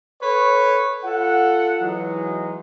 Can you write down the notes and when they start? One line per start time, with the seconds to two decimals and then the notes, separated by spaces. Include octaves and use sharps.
0.22 A4 B4 C#5
1.04 F4 A4 F#5
1.81 E3 F#3 G#3 D#4